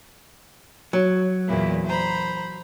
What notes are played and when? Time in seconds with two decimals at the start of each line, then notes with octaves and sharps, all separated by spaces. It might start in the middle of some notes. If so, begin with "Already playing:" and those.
0.93 F#3
1.47 E2 A#2 E4
1.86 C5 A#5 B5